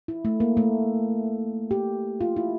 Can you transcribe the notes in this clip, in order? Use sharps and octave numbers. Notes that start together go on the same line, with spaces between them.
E4
A3
A#3
A3
G4
F4
E4